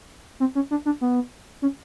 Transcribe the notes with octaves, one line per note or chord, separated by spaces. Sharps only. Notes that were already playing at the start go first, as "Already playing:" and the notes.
C4
C#4
D4
D4
B3
C#4